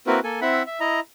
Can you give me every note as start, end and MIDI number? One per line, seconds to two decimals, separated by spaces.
0.07 0.20 58
0.07 0.20 60
0.07 0.20 64
0.07 0.20 66
0.07 0.20 70
0.07 0.20 71
0.24 0.40 58
0.24 0.40 69
0.24 0.40 80
0.41 0.63 60
0.41 0.63 64
0.41 0.63 76
0.41 0.63 78
0.41 0.63 83
0.66 0.80 76
0.80 1.00 64
0.80 1.00 75
0.80 1.00 82